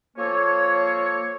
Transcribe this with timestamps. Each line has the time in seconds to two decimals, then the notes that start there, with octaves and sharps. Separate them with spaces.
0.17 F3 A#3 A4 C#5